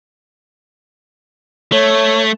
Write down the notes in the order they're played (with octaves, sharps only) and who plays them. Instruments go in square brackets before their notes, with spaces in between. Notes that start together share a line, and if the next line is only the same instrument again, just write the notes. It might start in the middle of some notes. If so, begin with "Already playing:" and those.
[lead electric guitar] A3 [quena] C#5